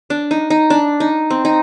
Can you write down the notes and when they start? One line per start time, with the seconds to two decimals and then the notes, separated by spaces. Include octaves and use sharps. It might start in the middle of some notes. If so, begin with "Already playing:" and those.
0.10 D4
0.31 D#4
0.50 D#4
0.70 D4
1.00 D#4
1.30 C4
1.45 D#4